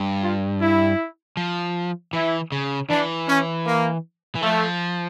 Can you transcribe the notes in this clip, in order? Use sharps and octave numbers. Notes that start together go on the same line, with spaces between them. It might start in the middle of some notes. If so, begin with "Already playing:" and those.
Already playing: G2
F4
E4
F3
E3 E4
C#3
E3 D4
C#4
A#3
E3
F3 A3